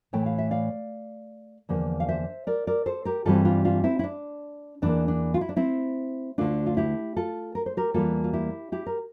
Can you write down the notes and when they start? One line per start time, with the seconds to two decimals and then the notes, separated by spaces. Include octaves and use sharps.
0.13 A2 E3 A3 G5
0.26 F5
0.38 E5
0.51 D5 F5
1.69 E2 D3 F3 A#3
2.00 F5
2.09 C5 E5
2.47 A#4 D5
2.67 A#4 D5
2.86 A4 C5
3.05 G4 A#4
3.25 G2 E3 G3 C4 F4 A4
3.45 D4 F4
3.65 D4 F4
3.84 C4 E4
3.99 E4
4.04 D4
4.82 E2 E3 A#3 D4
5.08 D4
5.34 F4
5.41 E4
5.49 D4
5.56 C4 E4
6.38 D2 D3 A3 D4 F4
6.66 F4
6.77 E4 G4
7.16 F4 A4
7.55 A#4
7.66 C5
7.77 G4 A#4
7.94 E2 E3 G3 A#3 F4 A4
8.24 F4
8.33 E4 G4
8.72 E4 G4
8.86 A#4